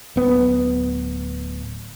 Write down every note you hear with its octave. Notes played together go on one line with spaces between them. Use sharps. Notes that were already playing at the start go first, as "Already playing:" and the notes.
D1 B3